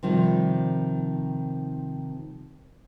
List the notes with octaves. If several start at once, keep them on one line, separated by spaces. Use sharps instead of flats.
C3 D#3 F3 G3